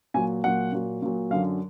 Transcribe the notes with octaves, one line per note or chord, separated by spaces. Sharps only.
A#2 F#3 G#5
A#2 F#3 F#5
A#2 F#3
A#2 F#3
F#2 D3 F#3 F5